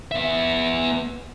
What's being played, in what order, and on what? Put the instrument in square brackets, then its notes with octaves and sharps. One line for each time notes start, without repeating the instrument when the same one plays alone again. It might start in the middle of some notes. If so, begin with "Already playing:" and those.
[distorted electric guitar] B3 E5